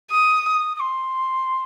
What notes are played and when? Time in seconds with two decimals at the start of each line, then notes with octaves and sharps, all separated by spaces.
0.10 D#6
0.54 D#6
0.76 D#6
0.80 C6